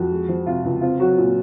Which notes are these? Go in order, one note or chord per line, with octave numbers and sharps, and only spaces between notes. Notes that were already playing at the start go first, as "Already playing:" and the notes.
Already playing: F2 F#4
G#3
F3
C3 F4
C#2
C4 F4
F#3 F#4
A#2